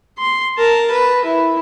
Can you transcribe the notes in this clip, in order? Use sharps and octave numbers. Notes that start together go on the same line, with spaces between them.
C6
A#4 A5
B4
E4